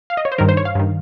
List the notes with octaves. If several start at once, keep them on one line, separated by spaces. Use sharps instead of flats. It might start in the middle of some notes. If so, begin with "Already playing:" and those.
F5
D#5
C#5
C5
G2 D#3 A#4
C5
C#5
F5
G2 D#3